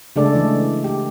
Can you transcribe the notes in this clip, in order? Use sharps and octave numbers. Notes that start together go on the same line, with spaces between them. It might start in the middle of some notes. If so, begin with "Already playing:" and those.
C#3 G#3 A3 D4 A4 D5
E3
G4